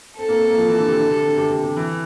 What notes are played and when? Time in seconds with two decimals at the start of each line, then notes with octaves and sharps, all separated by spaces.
0.19 C4 A4
0.28 A#3
0.38 C4
0.48 A#3
0.58 F3
0.68 E3
0.78 D3
0.88 C3
0.98 D3
1.11 C3
1.24 D3
1.37 C3
1.50 C3
1.63 C3
1.77 E3